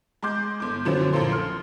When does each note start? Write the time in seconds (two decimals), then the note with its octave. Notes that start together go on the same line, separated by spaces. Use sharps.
0.23 G#3 C6 D6 G6
0.60 G1 D6
0.85 F#2 B2 D3 F3 C4 C#4
1.13 A#1 A2 F3 A#3 A4 C6
1.31 C6 F6